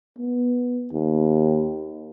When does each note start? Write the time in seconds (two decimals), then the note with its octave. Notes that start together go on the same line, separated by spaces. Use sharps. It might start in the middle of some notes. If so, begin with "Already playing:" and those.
0.19 B3
0.93 D#2